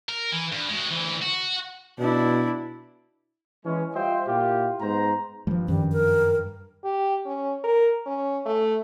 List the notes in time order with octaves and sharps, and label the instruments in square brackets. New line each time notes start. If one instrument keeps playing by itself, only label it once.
[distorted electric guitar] A#4
E3
G2
G#3 F#4
D2 E3
F#4
[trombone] B2 [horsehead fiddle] D4 E4
[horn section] E3 G#3 C#4
G3 F4 C5 D#5 E5 G5
A#2 E4 F4 G4
G#2 B3 C5 A#5
[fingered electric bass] G2 [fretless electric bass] F3 G3
[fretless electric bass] F#2 D#3 F3 [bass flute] G3
[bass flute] A#4
[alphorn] G4
C#4
A#4
C#4
A3